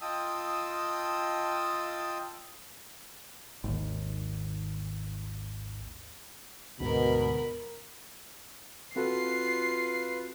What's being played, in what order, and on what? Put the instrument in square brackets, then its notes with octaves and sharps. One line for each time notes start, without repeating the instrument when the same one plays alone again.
[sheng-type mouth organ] F4 D#5 G5 A5 D#6 E6
[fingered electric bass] G#1 D#2
[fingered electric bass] D2 G#2 [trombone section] B2 [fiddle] A#4 B5
[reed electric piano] C4 F#4 A4 [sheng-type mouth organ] F4 B4 [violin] C7